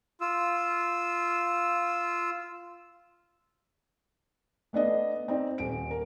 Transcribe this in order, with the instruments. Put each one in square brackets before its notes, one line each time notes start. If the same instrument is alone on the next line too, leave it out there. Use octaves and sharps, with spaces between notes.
[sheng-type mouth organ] F4 E6
[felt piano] A3 B3 D4 D#5
C4 D#4 D5
D#1 D7
A#4